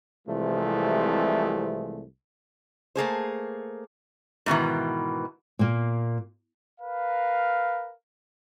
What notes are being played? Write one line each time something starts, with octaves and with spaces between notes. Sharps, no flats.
C2 C3 E3 F3 G#3 A3
A3 A#3 G#4 C5
G#2 B2 D#3 E3
A#2 A#3
A#4 B4 F5